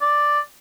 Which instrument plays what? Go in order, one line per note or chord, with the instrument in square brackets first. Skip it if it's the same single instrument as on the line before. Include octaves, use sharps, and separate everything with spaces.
[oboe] D5